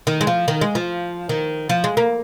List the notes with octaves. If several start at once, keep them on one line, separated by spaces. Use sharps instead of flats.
D#3
G#3
F3
D#3
G#3
F3
D#3
F3
G#3
A#3